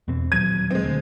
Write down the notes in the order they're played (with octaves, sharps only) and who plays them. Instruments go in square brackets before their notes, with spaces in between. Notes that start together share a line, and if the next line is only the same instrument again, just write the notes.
[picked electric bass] E2 B2 C4
[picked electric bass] D#1 F#3 [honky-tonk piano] G#6 D#7
[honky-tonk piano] G#3 C4
[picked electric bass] D2